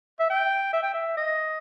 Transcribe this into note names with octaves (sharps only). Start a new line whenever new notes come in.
E5
G5
E5
G5
E5
D#5